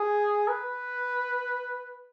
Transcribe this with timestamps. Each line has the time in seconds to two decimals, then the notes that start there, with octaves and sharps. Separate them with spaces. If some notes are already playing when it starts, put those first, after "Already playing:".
Already playing: G#4
0.48 B4